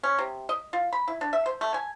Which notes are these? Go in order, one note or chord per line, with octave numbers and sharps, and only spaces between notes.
C#4
C3
D#5
F4
B5
E4
D4
E5
C5
A3
G#5